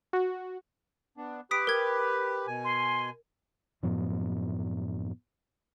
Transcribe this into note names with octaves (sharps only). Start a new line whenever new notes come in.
F#4
B3 D4
G4 B4 D#6 B6 D7
A#4 G#6
B2 G#5
C6
F#2 A2 F3 B3